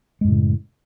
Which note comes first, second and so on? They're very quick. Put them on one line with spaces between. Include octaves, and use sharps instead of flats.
G#3 F#2 A2 C#3